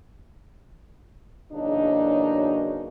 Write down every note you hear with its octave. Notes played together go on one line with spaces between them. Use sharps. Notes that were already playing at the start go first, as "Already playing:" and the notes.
E2 C#3 F#3 A#3 D4 D#4